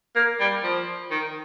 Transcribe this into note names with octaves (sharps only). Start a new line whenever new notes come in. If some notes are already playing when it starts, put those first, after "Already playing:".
A#3
G3
F3
D#3